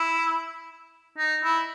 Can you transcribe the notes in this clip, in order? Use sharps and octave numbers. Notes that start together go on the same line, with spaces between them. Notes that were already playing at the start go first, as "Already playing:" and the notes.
Already playing: E4
D#4
E4